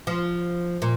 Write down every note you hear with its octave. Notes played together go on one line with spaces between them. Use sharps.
F3
A#2